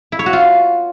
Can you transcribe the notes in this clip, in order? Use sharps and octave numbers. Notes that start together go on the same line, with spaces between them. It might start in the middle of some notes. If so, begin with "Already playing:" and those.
E4
C#5
F#4
F4